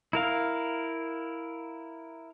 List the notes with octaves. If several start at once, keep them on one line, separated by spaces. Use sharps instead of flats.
E4 A#4 F5